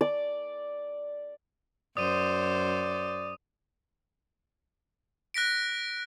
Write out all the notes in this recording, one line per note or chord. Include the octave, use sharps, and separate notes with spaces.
D5
F#2 C5 D5 D#6 D#7
F#6 A#6 B6 D7